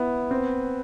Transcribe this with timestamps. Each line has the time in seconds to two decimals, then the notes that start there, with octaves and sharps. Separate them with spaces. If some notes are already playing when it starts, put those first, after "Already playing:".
Already playing: B3 E4
0.31 C4